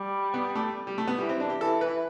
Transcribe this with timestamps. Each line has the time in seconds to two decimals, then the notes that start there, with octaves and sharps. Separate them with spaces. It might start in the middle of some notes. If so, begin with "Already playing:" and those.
Already playing: G3
0.34 B3
0.55 A3
0.87 G3
0.98 A3
1.07 B3
1.18 E3 G3
1.29 C4
1.40 D4
1.50 G4
1.60 E3 A4
1.81 B4